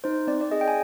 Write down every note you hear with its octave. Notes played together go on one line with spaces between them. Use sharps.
D#4 C5
C4 D5
D5
G#4 D#5
G5
G#5